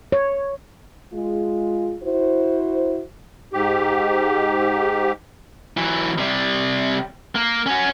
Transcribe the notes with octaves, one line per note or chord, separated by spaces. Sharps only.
C#5
G#3 F4
E4 F#4 C5
G#2 G4
E3 F#3
C3 G3
A#3
C#4 F#4